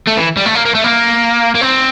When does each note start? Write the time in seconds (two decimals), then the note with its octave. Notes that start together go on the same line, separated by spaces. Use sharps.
0.07 A3
0.17 E3
0.37 G3
0.45 A3
0.55 A#3
0.65 A#3
0.75 A3
0.84 A#3
1.55 A#3
1.61 C4